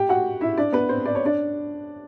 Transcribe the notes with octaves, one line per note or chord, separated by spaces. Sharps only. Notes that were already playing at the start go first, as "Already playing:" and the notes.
Already playing: G4 G5
F#4 F#5
E4 E5
D4 D5
B3 B4
C4 C5
D5
C#5
D4 D5